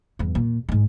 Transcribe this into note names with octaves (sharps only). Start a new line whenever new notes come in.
E2 G2
A#2
G#2 G#3